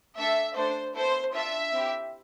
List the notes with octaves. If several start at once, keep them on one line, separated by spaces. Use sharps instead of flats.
A3 D4 A4 E5
A3 D4 A4 C5
B3 E4 A4 C5
D4 F4 A4 E5
C4 E4 G4